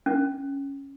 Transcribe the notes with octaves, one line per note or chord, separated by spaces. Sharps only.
C#4